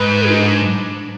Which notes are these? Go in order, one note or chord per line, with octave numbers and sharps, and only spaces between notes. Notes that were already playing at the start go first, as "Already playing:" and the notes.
Already playing: G#2 B4
D4